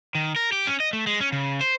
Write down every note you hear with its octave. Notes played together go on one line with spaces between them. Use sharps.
D#3
A#4
G4
C#4
D#5
A3
G#3
C#4
C#3
C5